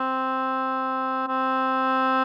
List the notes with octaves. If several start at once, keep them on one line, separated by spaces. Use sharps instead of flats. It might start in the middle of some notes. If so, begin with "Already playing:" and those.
Already playing: C4
C4